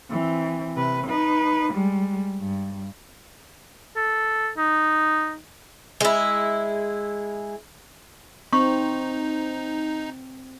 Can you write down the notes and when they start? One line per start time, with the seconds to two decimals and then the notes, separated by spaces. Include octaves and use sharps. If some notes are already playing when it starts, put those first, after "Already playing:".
0.11 E3 C4
0.76 C3 B4
1.08 D#4 B4
1.73 G3 G#3
2.41 G2
3.96 A4
4.57 D#4
6.01 G#3 E4
8.53 C4 D#4 C#6